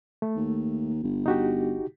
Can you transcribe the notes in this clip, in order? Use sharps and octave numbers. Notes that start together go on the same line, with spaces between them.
A3
D#2
G1
D#4 F#4 G4